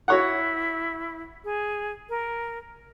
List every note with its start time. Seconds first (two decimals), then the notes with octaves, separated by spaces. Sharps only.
0.08 E4 F#4 C#5 F#5
1.44 G#4
2.09 A#4